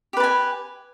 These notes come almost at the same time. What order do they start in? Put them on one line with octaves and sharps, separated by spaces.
G4 B4 A5 G#5